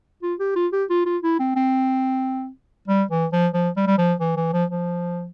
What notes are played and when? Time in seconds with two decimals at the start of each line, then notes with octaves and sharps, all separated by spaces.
0.23 F4
0.40 G4
0.56 F4
0.73 G4
0.90 F4
1.06 F4
1.23 E4
1.39 C4
1.56 C4
2.88 G3
3.11 E3
3.32 F3
3.54 F3
3.77 G3
3.87 G3
3.98 F3
4.20 E3
4.37 E3
4.53 F3
4.71 F3